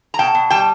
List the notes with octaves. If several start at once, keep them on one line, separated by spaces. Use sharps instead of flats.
A#5
B2 G5 A5
B2
G3 G5 A5